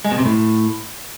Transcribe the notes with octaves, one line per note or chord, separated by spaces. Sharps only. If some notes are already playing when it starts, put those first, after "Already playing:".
G#3
B2
C3
A2